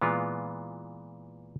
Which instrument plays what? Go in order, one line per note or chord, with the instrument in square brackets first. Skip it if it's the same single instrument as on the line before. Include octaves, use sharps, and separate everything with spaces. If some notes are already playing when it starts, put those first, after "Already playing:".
[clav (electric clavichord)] A#2 E3 G#3 B3 F4